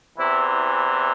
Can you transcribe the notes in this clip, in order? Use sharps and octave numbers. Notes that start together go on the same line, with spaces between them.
E2 C3 E3 E4